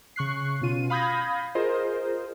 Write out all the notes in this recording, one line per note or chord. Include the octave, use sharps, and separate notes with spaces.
C#3 C#6 F#6 C7
B2 C#4 F4 D#7
F5 B5 D#6 G6 G#6 A#6
F4 G#4 A#4 C5 D#5